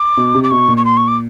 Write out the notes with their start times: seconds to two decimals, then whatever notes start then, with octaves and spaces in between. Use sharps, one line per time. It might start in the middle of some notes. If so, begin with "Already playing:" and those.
Already playing: D6
0.17 B2
0.35 C3
0.44 D6
0.51 B2 C#6
0.68 A#2
0.77 C#6
0.85 C6
0.97 C#6
1.08 D6